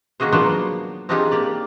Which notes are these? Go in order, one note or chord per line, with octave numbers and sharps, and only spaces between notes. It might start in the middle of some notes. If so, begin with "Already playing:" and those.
D#3 A#3 F#4 G#4 C5
F3 F#3 A#3 B3 D4 C5
C4 D4 D#4 F4 G4 G#4
A#3 G4 D5